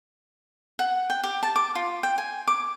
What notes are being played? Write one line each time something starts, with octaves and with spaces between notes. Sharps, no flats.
F#5
G5
G4
A5
D6
F4
G5
G#5
D6